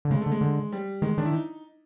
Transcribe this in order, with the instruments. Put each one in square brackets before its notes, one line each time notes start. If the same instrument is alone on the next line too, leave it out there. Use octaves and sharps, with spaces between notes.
[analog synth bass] D3
[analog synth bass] C#3 [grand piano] G#3
[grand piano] A3
[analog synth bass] D3
[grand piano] G#3
[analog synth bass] D3
[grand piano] G3
[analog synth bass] D#3 [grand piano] G#3
[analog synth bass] D#3 [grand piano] D4
[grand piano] E4
D#4